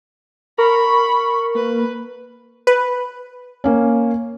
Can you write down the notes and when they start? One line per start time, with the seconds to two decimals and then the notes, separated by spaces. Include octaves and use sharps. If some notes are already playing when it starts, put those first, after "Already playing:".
0.58 A#4 B5 C#6
1.55 A#3 B4
2.67 B4
3.64 A#3 C#4